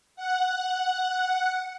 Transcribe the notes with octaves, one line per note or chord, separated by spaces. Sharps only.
F#5